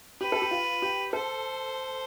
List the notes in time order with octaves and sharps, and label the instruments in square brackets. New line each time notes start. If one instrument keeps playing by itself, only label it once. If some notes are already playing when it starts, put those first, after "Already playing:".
[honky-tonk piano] G4 [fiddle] B4
[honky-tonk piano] A4
G4
F4
G4
[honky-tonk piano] A4 [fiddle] C5